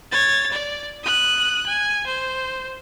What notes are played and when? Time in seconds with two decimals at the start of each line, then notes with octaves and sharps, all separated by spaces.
0.12 C#5 A6
0.52 D5
1.04 D#6 F#6
1.66 G#5
2.06 C5